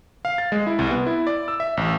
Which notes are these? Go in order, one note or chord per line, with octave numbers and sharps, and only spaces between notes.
F5
A6
G#3
E4
C2
B3
E4
D5
E6
E5
A1